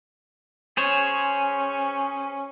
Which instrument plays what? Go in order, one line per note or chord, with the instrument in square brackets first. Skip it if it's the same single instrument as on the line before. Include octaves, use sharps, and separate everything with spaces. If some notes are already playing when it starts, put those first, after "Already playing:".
[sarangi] C#4 [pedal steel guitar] G#4 C5 C#5